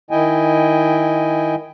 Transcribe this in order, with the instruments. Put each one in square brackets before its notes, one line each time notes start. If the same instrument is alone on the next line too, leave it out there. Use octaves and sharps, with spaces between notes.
[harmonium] D#3 E4 D#5 G5 G#5